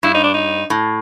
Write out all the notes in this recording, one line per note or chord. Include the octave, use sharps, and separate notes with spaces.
G2 E4
D#4
D4
D#4
A2